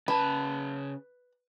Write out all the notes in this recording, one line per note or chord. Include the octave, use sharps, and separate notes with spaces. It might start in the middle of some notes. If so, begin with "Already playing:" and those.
C#3 B4 A5